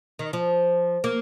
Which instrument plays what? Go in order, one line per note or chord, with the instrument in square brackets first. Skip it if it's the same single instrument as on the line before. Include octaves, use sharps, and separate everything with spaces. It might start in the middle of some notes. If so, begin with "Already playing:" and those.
[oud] D#3
F3
A#3